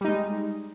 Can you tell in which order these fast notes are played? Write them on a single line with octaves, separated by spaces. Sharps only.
G3 D#4 G#3